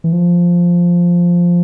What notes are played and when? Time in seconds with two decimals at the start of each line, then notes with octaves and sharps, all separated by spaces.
0.04 E3
0.12 F3